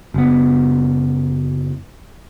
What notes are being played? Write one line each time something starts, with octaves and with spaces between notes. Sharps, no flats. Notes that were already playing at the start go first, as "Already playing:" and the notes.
F#1 B3